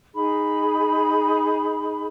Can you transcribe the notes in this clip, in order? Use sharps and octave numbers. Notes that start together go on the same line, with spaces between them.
D#4 G#4 B5